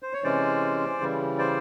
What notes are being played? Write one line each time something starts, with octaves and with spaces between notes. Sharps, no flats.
C5
C#5
C3 E3 G#3 C#4 C5 D5
C#3 E3 G3
C5 D5